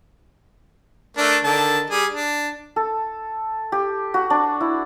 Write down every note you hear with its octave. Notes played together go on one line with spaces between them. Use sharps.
A3 D4 A#4
D3 D#3 A5
G3 G#4
D4
A4
G4
F#4
D4
E4